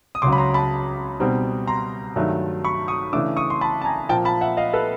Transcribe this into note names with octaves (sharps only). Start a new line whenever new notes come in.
D#6
C#2 C#3 F#3 C6 D6
B5
A#5 C6
A5 B5
B2 G3 C4 D#4
A#5 C6
G2 D#3 F#3 A3
B5 C#6
C#6 D#6
C#3 E3 A3 D4 D6 E6
C#6 D#6
C6
A5 B5
A5
G#5 A#5
A#2 F3 A#3 G5 A5
A5 B5
E5 F#5
D#5 F5
A4 B4